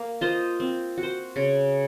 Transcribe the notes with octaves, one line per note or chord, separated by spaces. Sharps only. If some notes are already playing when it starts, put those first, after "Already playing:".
Already playing: A#3
F4 C5 D#5
C4
F#4
C5
C#3